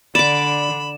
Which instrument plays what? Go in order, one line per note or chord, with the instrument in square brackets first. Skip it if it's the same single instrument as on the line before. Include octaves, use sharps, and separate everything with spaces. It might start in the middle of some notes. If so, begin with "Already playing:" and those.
[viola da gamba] D3 [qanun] D5 D6 [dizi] B5 [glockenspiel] E7